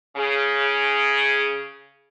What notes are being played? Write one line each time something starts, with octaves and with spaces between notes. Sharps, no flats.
C#3 G#4